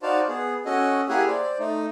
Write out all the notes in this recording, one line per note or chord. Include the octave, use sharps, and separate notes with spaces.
D#4 F#4 C5 D5 F5 A5
B3 G#4
C#4 F#4 A4 D#5
A#3 E4 G4 G#4 F#5 G#5
C5 D5
A3 D#4